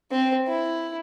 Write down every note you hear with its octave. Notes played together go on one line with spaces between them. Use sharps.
C4
E4